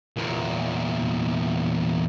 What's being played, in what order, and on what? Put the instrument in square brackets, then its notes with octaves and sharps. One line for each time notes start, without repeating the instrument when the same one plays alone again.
[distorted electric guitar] E2 A#2